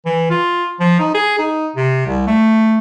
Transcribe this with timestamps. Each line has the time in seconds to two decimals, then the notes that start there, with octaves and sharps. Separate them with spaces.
0.06 E3
0.30 F4
0.80 F3
1.00 D#4
1.15 G#4
1.39 D#4
1.76 C3
2.07 C2
2.27 A3